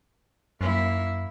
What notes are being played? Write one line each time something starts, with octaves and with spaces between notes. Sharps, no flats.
F#2 A#3 E4